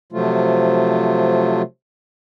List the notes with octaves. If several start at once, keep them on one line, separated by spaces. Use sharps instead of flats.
C3 F3 F#3 A3 F4